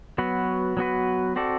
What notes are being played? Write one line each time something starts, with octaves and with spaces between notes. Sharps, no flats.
F#3 B3 F#4 B4
F#3 B3 F#4 B4
C4 F#4 A4 D5